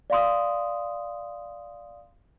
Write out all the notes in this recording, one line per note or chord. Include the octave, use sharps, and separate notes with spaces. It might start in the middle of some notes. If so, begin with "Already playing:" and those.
D5 F5 C6 D#6